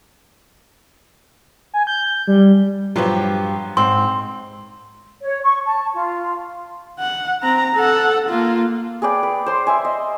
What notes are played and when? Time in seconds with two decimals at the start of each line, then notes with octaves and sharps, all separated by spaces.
1.74 G#5
1.87 G6
2.28 G3
2.96 G2 F3 F#3 B3 G4
3.77 G#2 C4 C6
5.22 C#5
5.42 C#6
5.66 A5
5.93 F4
7.00 F#5
7.43 C4 A#5
7.75 A4 F#5
8.29 A#3 F4
9.02 G#4 B4 D5 G5
9.23 B4
9.46 C5 C6
9.67 C5 E5 G#5
9.85 D#5